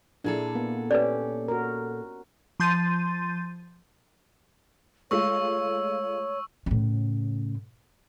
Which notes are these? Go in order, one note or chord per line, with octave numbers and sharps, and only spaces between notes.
A#2 D4 E4 G#4 A4
A#3 B3
C#4 G4 B4 D5
F#4 A#4
F3 C6 G6 A6 D#7
G#3 A3 F4 C#5 C#6 E6
A2 C#3